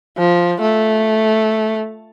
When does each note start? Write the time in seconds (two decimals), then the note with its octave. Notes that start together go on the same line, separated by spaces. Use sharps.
0.18 F3
0.61 A3